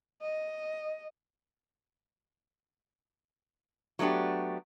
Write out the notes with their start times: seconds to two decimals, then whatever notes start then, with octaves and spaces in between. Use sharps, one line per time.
0.22 D#5
3.99 F#3 A3 B3 D4 G4